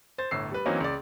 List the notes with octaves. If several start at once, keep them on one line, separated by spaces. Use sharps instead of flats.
C5 A6
G1 A2 E6 C7
G3 B4
E3 F#3 A#3 C4 C#4 D#4
C#2 D5